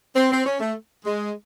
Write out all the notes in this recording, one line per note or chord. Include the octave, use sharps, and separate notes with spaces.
C4
C4
C#4
A3
G#3